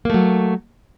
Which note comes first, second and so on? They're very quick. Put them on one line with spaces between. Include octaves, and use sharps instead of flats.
A#3 A3 F#3